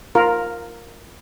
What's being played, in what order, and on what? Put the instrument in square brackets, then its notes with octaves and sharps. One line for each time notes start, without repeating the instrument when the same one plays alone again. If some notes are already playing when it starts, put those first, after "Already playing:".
[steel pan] F4 A#4